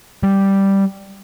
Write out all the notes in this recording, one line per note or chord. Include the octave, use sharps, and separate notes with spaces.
G3